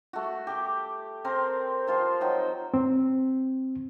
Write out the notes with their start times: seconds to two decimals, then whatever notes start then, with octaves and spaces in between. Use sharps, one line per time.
0.13 A3 F#4
0.47 G4 D6
1.25 C4 A#4 C5
1.87 F3 F4 C5
2.21 F#3 D#4 G5
2.74 C4